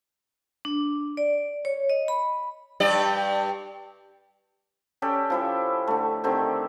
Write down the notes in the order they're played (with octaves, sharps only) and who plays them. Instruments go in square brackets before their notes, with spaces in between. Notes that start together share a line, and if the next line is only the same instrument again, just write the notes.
[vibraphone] D4
D5
C#5
D#5
B5
[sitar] G2 G4 D5
[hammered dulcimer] C#4 G4 A4 D5
F3 E4 G4
D3 A3
D3 D#3 C4 G4